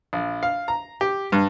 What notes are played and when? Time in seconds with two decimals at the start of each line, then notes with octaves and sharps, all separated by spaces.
0.13 A#1
0.43 F5
0.68 A#5
1.01 G4
1.32 G2